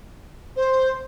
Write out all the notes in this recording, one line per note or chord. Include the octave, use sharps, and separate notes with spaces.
C5